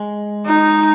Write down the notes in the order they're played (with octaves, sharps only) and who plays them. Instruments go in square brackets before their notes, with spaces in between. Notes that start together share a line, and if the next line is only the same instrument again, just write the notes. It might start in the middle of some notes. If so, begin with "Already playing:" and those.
Already playing: [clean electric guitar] G#3
[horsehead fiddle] D#4